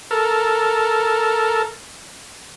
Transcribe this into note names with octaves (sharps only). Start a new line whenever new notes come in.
A4 A#4